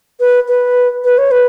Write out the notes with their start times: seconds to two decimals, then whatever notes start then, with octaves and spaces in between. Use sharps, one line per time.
0.20 B4
0.48 B4
1.04 B4
1.18 C#5
1.31 B4